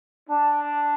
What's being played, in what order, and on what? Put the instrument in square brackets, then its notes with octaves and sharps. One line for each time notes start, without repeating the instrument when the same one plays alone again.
[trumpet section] D4 [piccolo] A5